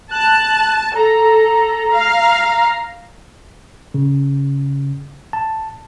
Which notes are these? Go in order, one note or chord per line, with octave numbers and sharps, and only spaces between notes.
A5 F#6
A4 A#5
F5
C#3
A5